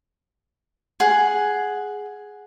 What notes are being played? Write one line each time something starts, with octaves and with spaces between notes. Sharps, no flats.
G#4 F#5